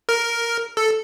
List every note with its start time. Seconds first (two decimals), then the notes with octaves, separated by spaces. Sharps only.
0.09 A#4
0.77 A4